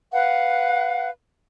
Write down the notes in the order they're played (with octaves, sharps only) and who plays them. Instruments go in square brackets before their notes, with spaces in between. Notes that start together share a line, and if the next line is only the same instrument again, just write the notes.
[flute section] B4 F5 F#5